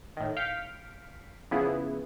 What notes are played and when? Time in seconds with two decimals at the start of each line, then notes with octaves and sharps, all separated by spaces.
0.17 A2 D#3
0.37 F5 F6 G6 B6 C#7 D7
1.51 C#3 F3 B3 E4 G#4